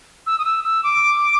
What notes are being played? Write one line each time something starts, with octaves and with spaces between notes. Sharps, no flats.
E6
D#6
E6
E6
D6